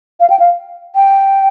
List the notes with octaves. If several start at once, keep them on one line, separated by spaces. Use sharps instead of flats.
F5
G5
F5
G5